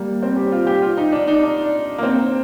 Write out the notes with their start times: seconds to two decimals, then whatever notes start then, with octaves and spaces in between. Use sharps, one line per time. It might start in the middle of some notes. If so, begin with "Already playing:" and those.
Already playing: G3 A#3
0.23 C4
0.37 G4
0.52 F4
0.67 G4
0.82 F4
0.97 D#4
1.12 D4
1.28 D#4
1.43 D4
1.98 A#3
2.03 C4